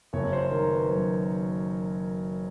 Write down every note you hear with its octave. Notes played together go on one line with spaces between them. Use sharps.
F#1 C#5
C5
D#3 A#4
B4
F#2 C5